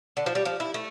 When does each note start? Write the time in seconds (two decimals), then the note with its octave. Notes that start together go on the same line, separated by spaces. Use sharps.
0.17 D3
0.26 F3
0.35 G3
0.45 F3
0.60 E4
0.74 A3